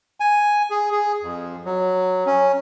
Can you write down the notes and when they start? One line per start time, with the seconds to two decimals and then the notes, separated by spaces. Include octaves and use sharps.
0.20 G#5
0.70 G#4
0.92 G#4
1.22 F2
1.65 F#3
2.26 C#4